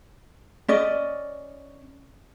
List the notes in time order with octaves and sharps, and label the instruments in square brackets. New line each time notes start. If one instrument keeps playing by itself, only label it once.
[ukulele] C#4 D5 D#5